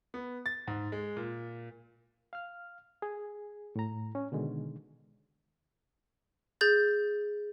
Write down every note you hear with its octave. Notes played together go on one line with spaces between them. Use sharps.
B3
A6
G#2
G#3
A#2
F5 F6
G#4
A2 A#5
C#4
B2 D3 D#3 G#3
G#4 G6 A6